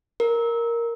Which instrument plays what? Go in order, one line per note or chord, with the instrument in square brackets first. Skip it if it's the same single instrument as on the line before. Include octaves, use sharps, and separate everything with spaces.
[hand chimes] A#4